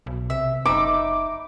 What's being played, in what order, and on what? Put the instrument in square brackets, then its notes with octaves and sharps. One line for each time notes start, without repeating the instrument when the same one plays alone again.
[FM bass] B1
[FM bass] C3 [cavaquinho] E5
[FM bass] F#1 [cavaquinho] D#4 E5 B5 [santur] D6